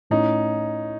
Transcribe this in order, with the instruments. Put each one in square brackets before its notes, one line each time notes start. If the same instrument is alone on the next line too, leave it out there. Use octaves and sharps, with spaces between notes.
[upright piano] A2 [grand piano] C#4 D#4